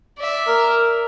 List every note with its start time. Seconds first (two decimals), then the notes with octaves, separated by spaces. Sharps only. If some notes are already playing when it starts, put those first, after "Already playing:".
0.18 D5 E5
0.47 A#4